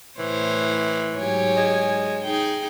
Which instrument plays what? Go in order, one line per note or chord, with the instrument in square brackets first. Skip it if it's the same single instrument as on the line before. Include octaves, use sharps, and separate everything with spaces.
[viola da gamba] A2 C5 C#5 [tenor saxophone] E3
[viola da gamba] G#2 F#3 G4 [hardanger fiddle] C#5 G#5
[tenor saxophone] G#3
[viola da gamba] D#4 G#4 [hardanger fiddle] G5